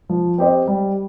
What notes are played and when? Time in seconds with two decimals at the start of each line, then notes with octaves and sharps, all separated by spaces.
0.09 F3
0.38 C4 G4 C5 D#5
0.67 G3